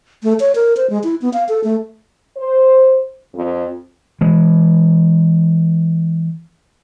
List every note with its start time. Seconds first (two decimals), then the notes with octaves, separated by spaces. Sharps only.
0.23 A3
0.40 C#5
0.55 A#4
0.77 C5
0.90 G#3
1.04 E4
1.22 B3
1.33 F5
1.49 A4
1.64 A3
2.37 C5
3.35 F2
4.21 E3 G#3